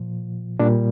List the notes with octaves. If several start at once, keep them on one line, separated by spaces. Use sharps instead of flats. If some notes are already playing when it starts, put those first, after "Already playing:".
Already playing: A#2 F3
A#2 G3 D4